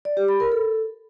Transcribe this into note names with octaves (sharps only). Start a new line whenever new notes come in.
D5
G4
B5
A#4
A4